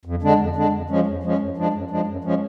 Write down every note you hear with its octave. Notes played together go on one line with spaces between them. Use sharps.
F2
D3 G#3 D4
F2
D3 G#3 D4
F2
F3 G#3 C#4
F2
F3 G#3 C#4
F#2
F3 G#3 D4
F#2
F3 G#3 D4
F#2
F3 G#3 C#4